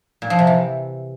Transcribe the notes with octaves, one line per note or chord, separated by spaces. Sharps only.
A#2
F3
C3
E3